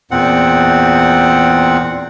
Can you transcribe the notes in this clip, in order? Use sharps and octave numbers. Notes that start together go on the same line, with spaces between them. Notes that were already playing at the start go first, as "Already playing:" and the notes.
E2 A#2 C4 F#5